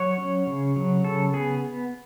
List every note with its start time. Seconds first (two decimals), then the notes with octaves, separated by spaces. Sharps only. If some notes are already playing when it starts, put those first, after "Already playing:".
Already playing: F#3 C#5
0.18 C#4
0.47 C#3
0.76 F#3
1.04 C#3 A4
1.33 B3 G#4